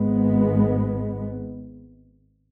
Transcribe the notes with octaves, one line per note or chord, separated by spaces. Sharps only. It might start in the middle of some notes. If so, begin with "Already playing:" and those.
Already playing: G#1 G#2 G#3 B3